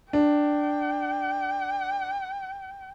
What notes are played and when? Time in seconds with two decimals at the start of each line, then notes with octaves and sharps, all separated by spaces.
0.13 D4 G5